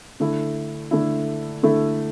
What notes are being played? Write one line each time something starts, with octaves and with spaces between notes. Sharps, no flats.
D3 A3 E4
D3 A3 E4
D3 A3 E4